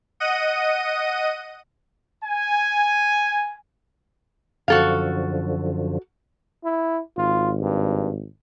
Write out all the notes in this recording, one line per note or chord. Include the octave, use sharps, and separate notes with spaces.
D#5 F#5 D#7
G#5
F#2 D3 F3 F#4 A4 F5
E4
G#1 F4
G2